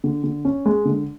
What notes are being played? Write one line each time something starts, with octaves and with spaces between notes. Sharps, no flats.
D3
D3
C#4
G#3
D3